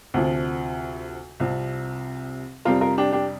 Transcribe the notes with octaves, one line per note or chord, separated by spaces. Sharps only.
D2 C3 F3
C2 C3 F3
F2 C3 G3 F4 A#4
F4 A#4
D4 G4
D4 G4